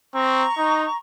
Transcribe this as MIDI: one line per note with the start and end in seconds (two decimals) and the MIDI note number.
0.15 0.45 60
0.15 0.97 82
0.15 0.97 85
0.58 0.86 63